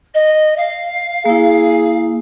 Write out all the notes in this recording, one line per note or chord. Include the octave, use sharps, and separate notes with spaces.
D#5
F5
A#3 E4 G#4